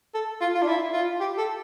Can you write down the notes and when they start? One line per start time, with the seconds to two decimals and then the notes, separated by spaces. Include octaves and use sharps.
0.14 A4
0.41 F4
0.55 F4
0.62 D4
0.67 E4
0.93 F4
1.20 G4
1.38 A4